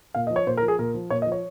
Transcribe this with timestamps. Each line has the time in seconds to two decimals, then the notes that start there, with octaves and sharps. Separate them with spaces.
0.15 A#2 F5
0.27 F3 D#5
0.36 C#5
0.46 A#2 C5
0.57 A#4
0.62 F3
0.68 G#4
0.79 A#2 A#4
0.94 F3
1.10 A#2 C#5
1.22 D#5
1.26 F3
1.32 C#5